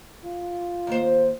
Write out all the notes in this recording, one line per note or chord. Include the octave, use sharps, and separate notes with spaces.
F4
D#2 C5